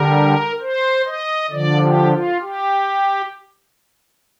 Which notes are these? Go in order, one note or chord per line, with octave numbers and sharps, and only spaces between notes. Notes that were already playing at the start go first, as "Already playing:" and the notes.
Already playing: D3 G3 A#4
C5
D#5
D3 F3 D5
G4
F4
G4